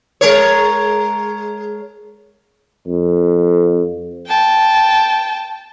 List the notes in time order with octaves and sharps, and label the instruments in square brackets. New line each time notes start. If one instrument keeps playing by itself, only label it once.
[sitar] G#3 A#4 C#5
[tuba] F2
[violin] G5 A5